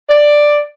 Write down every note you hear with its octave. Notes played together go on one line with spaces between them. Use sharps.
D5